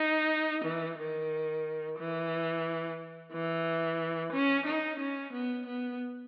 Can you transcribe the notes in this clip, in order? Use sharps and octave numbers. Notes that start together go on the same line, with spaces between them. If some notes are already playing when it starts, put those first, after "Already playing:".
Already playing: D#4
E3
D#3
E3
E3
C#4
D#4
C#4
B3
B3